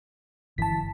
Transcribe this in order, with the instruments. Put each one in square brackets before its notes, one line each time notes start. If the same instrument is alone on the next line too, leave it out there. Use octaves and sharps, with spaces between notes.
[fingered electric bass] G1 E3 [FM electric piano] A5 B6